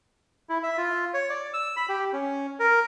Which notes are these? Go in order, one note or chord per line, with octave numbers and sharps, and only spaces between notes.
E4
E5
F4
C#5
D5
E6
B5
G4
C#4
A#4